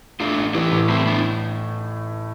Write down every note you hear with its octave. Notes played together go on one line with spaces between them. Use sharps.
A3 D4 F4
A1
E3 E4 G4
A2
A3 C4 E4
B3 D4